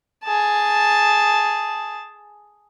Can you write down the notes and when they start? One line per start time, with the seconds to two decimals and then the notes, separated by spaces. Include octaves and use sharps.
0.23 G#4 A5